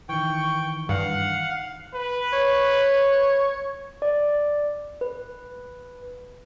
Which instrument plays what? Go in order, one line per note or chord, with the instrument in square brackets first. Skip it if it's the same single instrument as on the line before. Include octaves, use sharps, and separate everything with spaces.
[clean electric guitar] D#3 E3 [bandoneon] G5 [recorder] C#6
[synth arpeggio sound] G2 [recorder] F5 [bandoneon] F#5
[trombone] B4
[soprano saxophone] C#5
[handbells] D5
B4